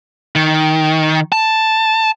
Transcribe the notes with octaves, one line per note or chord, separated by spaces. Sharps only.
D#3
A5